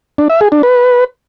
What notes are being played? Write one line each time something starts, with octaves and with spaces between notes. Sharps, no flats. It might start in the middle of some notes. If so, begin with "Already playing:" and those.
D4
E5
G#4
D4
B4